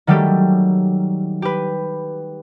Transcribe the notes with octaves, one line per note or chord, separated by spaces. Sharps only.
D#3 F#3 G3 A3 G4 A4
G4 B4